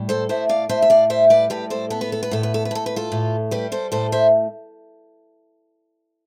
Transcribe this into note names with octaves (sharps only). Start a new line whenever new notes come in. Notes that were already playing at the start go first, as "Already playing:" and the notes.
Already playing: A2 G3
A4 C5
A2 C5 E5
D5 F5
A2 C5 E5
E5
D5 F5
G3 C5 E5
B4 D5
A2 G4 B4
A4 C5
B3 A4
B4
A4
B4
A2 A4
B4
A4
B4
A2 A4
B4
F4 A4
A2
G3 G4 B4
A4 C5
A2 A4 C5
C5 E5